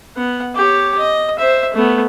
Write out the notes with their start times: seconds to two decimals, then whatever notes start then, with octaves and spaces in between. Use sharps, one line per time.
0.17 B3 F#5
0.56 G4 C#5
0.98 D#5
1.38 C5 E5
1.74 A3 B3